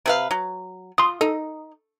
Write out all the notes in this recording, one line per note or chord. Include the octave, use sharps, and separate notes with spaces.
C3 B4 F5
F#3
F4 C6 D#6
D#4 A4